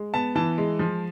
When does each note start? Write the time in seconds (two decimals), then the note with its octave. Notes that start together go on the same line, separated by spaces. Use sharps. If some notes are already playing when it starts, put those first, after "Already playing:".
Already playing: G#3
0.14 B3 A5
0.35 E3 A5
0.58 G#3
0.79 F3